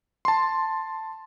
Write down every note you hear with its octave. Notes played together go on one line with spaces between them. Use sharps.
A5 C6